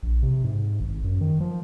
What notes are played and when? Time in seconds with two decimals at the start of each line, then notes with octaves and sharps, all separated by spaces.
0.03 A#1
0.23 C3
0.44 G#2
0.80 G#1
1.04 F#2
1.21 D#3
1.40 F3